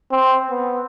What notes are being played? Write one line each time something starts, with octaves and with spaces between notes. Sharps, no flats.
C4
B3